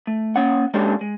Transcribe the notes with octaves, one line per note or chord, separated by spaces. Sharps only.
A3
A#3 C#4 F#5
G#3 A#3 C#4 D4 G4 A4
G#3